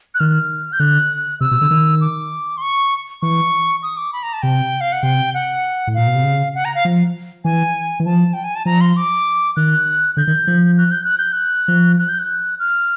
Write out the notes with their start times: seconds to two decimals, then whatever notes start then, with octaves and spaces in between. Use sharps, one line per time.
0.15 F#6
0.20 D#3 F6
0.73 G6
0.80 D3 F#6
1.41 C3 E6
1.51 B2
1.61 D3
1.71 D#3
2.01 D6
2.57 C6
2.62 C#6
3.22 E3 C#6
3.83 D#6
3.97 D6
4.13 B5
4.23 A#5
4.33 A5
4.42 C3 G5
4.81 F5
4.92 F#5
5.03 C3 G5
5.34 F#5
5.87 A2
5.94 A#2 F5
6.07 B2
6.15 C3
6.24 C#3
6.55 F#5
6.65 A#5
6.75 F5
6.85 F3
7.45 E3 G#5
8.00 E3
8.06 F3 A5
8.33 G5
8.44 G#5
8.55 A5
8.65 F3 A#5
8.81 C6
8.97 D6
9.57 D#3 F#6
10.17 D3 G6
10.27 D#3
10.47 F3
10.78 F#6
10.91 G6
11.04 F#6
11.18 G6
11.33 F#6
11.68 F3
11.98 F#6
12.09 G6
12.19 F#6
12.59 F6